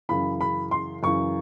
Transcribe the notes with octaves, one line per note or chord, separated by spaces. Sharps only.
F#2 C#3 E3 B5
B5
C6
F#2 C#3 E3 C#6